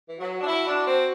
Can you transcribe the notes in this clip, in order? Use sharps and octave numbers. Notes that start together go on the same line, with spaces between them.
E3
F#3 F#4
D4
E4
D4
C4